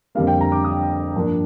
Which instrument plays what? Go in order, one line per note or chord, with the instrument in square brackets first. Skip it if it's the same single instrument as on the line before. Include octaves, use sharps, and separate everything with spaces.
[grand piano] F2 D3 G3 A#3 F5
G5
A#5
D6
D#6
G2 F3 A#3 D4